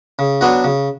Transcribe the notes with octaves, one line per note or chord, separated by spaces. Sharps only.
C#3
F#3 B3 D4 F#4
C#3